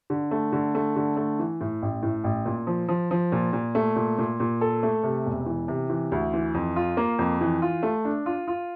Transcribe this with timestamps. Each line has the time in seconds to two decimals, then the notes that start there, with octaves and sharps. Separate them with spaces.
0.10 D3
0.31 A3
0.52 D3
0.75 A3
0.96 D3
1.17 A3
1.39 E3
1.61 A2
1.82 A1
2.03 A2
2.24 A1
2.45 A#2
2.67 F3
2.89 F3
3.11 F3
3.32 A#2
3.53 A#2
3.75 A3
3.96 A#2
4.18 A#2
4.40 A#2
4.61 A4
4.83 A3
5.03 C3
5.26 E1
5.46 E3
5.68 C3
5.90 E3
6.12 D2
6.33 E3
6.54 F2
6.76 F4
6.97 A#3
7.19 F2
7.41 E3
7.62 F4
7.83 A3
8.05 D4
8.26 F4
8.48 F4